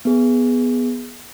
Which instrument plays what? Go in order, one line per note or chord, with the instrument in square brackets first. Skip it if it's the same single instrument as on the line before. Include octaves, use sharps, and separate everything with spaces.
[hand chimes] B3 G#4